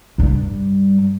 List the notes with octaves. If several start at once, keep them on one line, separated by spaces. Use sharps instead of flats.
G2 G3